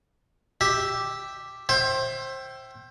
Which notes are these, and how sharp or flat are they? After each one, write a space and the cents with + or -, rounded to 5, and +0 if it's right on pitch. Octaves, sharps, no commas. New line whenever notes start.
G4 +0 E5 +0
C5 +25 E5 +15 G5 -20